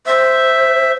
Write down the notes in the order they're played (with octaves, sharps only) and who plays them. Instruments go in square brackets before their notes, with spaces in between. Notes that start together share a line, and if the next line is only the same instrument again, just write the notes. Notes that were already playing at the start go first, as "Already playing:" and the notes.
[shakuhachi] C5 [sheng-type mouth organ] E5